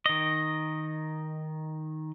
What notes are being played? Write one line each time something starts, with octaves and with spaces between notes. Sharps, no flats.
D#3 D#5